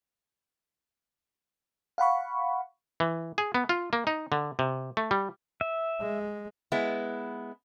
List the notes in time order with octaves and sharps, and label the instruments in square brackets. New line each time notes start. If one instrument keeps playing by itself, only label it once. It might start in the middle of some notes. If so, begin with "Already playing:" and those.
[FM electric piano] F5 F#5 B5 C#6
[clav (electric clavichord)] E3
G#4
B3
F4
A#3
D#4
D3
C3
A3
G3
[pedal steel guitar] E5
[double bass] G#3
[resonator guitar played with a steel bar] G#3 B3 E4